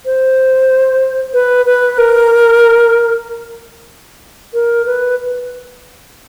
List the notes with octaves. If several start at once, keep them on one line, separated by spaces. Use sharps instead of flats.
C5
B4
B4
A#4
A#4
B4